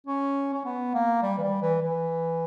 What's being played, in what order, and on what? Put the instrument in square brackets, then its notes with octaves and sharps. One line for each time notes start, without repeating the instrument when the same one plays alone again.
[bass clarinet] C#4
C#4
B3
A#3
G3
E3
G3
E3
E3